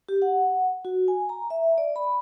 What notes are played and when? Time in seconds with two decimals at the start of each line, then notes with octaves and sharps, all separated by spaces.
0.09 G4
0.22 F#5
0.85 F#4
1.08 G#5
1.29 A#5
1.50 E5
1.78 D5
1.96 B5